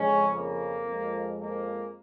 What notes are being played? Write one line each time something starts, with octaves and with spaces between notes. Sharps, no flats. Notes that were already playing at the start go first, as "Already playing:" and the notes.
Already playing: F2 C#3 F3 G#3 C#4
A#3
F2 F3 G#3
A#3